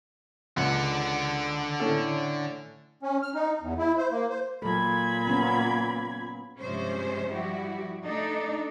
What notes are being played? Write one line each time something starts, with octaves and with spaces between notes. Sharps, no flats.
C#2 D3 F#5
A2 C#4 A4
C#4
F6
D#4
E2
E4
C5
A#3
C5
A#2 F#3 A4 B5 G#6
B3 C#4 F4
G2 C3 F3 G#3 C#4 C5
F3 G3 E4 F#4 G4
A3 D4 D#4 A4